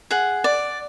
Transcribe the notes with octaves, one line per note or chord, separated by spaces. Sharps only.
G#4 F#5
D5